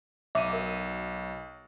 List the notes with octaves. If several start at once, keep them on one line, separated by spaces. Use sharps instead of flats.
B1 E5 D6 D#7
A#4